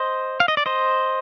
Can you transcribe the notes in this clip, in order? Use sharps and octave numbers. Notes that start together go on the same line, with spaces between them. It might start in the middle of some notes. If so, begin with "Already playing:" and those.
Already playing: C5 D#5
F5
D#5
D5
C5 D#5